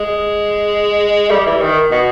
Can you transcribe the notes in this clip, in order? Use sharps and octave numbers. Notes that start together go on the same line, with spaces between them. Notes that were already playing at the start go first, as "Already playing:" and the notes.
Already playing: G#3
G3
E3
D#3
B2